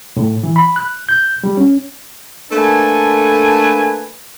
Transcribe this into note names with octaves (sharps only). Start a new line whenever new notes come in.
A2
E3
B5
F#6
G6
G3
C#4
A3 A#3 D4 A4 B4 G#5